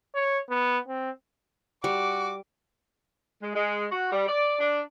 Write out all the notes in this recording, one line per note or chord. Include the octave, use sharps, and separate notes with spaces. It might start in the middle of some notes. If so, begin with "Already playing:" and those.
C#5
B3
C4
G3 F#4 D6
G#3
G#3
F#4
G3
D5
D4